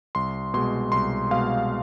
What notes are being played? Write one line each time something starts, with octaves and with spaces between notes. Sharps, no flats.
C2 C6
B2 G#3 C6
C2 C6
B2 G#3 F5